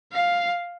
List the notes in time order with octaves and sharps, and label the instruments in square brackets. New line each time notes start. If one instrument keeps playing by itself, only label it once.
[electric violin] F5